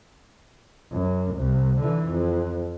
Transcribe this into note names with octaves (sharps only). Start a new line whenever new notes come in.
F#2
C2
D3 E3
F2